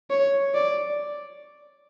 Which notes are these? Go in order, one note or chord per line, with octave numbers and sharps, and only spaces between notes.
C#5
D5